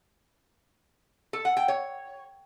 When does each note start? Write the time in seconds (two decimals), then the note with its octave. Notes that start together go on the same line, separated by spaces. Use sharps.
1.33 A4
1.45 F#5
1.57 G5
1.68 C#5